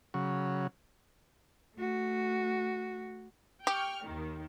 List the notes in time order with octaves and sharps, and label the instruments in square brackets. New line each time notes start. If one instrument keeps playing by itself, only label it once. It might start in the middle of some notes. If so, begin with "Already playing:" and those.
[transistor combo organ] C#3 F#3
[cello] A3 F#4
[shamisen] G4 [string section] G5 C#6 F6
[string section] D#2 D#3